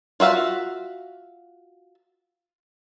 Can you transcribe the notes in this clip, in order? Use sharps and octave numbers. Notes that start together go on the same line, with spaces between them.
F4 F#4 E5 F5